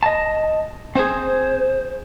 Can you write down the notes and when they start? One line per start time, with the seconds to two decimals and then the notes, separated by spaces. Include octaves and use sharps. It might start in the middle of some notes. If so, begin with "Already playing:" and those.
0.03 D#5 A5
0.95 C4 G#4 C5